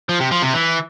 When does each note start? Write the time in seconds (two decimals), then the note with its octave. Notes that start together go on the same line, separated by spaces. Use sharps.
0.09 F3
0.20 C3
0.32 F3
0.43 C3
0.54 E3